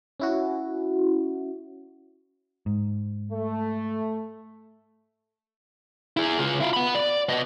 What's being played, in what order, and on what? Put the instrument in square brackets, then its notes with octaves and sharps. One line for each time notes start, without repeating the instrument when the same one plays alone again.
[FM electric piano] C#4 E4 F#4
[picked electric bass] G#2
[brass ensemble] A3
[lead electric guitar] E4 G#4
C#3 F4
E4 F5
F#5 B5
D5
B3 D#5